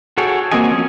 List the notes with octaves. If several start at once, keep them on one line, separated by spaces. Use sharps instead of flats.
F#4 G#4 A4 C#5 G5
A#3 C4 F#4 D#5 G#5
F3 C#4